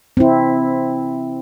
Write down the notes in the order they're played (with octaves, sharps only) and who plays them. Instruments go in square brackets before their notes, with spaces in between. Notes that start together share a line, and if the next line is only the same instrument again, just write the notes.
[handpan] C4 E4